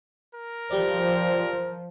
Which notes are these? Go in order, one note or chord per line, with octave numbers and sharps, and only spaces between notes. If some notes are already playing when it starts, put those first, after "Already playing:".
A#4
F3 G3 C5 D5